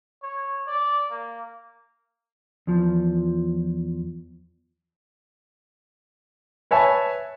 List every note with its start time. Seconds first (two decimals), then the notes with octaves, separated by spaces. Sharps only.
0.23 C#5
0.67 D5
1.10 A#3
2.67 E2 F3
6.71 B4 C#5 E5 G#5 A5